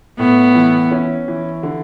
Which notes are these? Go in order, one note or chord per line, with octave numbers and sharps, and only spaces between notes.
A2 B3
E3
C#4
E3
D3